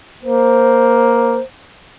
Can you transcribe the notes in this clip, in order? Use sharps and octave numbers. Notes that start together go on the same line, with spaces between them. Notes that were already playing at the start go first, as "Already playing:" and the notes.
A#3 C5